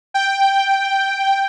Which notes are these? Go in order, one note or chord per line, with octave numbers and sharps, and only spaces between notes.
G5